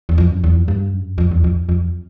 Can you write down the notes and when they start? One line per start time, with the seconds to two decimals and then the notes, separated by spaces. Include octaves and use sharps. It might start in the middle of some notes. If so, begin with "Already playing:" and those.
0.09 E2
0.18 F2
0.30 F#2
0.44 E2
0.55 F2
0.68 G2
0.93 F#2
1.18 F2
1.31 E2
1.44 F2
1.69 F2